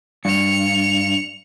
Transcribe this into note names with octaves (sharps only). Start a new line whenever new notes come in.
G2 C#7 F7